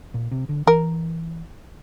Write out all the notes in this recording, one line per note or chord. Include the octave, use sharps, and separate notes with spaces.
A#2
C3
D3
E3 A#4